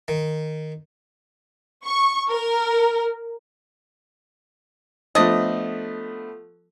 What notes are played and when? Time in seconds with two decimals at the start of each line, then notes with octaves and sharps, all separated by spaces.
0.08 D#3
1.85 C#6
2.30 A#4
5.15 F3 A3 B3 D4 D#5